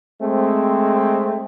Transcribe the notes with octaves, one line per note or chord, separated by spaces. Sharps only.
G#3 A3 C4